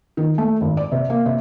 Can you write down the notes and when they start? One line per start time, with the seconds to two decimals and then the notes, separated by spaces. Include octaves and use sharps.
0.17 D#3
0.38 A3
0.61 G#1
0.77 D5
0.92 C3
1.10 A#3
1.26 C3